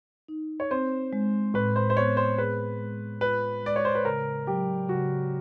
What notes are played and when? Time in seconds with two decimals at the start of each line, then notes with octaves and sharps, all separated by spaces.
0.29 D#4
0.60 C#5
0.71 C4 C5
1.13 G#3
1.54 A2 B4
1.76 C5
1.90 C5
1.97 B3 C#5
2.17 C5
2.38 G#4 B4
2.80 G#3
3.21 F4 B4
3.63 G#3 D5
3.76 C#5
3.85 C5
3.95 B4
4.05 C#3 A#4
4.47 F#3 G4
4.88 C#3 F#4